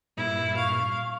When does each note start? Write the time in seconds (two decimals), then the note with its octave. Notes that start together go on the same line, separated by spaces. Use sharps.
0.17 G2 A#2 E4
0.57 F5 C#6